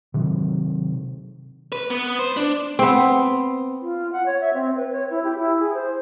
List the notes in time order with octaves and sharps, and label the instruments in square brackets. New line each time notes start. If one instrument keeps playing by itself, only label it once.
[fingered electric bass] C3 D#3 F#3
[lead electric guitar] B4
B3
C5
D4
[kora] B3 C4
[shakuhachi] F4
F#5
C#5
E5
C4
B4
C#5
E4
G4
E4
G#4
C5